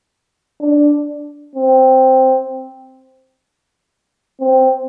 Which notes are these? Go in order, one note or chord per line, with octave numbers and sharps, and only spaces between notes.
D4
C4
C4